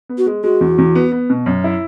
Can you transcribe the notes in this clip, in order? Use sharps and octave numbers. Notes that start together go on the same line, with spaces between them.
B3
F#4
G#3
G#3 F#4
E2
E2
B3
B3
B2
F#2
E4